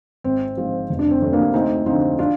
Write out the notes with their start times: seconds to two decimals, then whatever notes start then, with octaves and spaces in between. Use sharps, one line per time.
0.24 G#1 C4
0.57 G#2 F3
0.89 F1
0.99 D4
1.11 C4
1.22 F2 C3
1.33 A#3 D4
1.53 D2 C4 D#4
1.86 D3 F3 C4 D#4
2.19 D4 F4